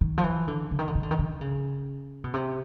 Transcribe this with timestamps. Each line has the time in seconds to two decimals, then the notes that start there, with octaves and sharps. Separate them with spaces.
0.01 D#3
0.18 F3
0.24 E3
0.48 D3
0.71 D3
0.79 D#3
0.88 D3
0.95 D#3
1.03 D3
1.11 D#3
1.19 D3
1.41 C#3
2.24 B2
2.34 C3